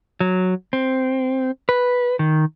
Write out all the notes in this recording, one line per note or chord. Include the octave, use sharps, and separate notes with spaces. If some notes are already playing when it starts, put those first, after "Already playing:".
F#3
C4
B4
D#3